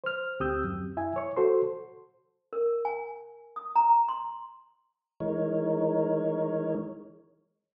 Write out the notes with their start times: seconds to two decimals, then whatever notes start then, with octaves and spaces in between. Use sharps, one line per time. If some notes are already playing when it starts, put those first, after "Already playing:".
0.04 C5 F6
0.40 D2 C4 G4 D#6 E6 G6
0.64 F#2
0.97 E4 E5 G#5
1.16 C#5 C#6
1.37 F#4 A4 C5 C6
2.53 A#4
2.85 G#5
3.56 D#6
3.76 A#5
4.09 C6
5.20 E3 G#3 D#4 A#4 C#5